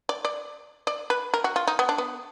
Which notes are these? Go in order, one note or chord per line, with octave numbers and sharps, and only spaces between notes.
D5
D5
D5
B4
A#4
F#4
F4
D#4
B3
D4
B3